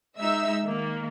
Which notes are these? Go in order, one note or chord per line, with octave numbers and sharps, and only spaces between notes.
G#3 D#4 E5 E6
D#3 A#3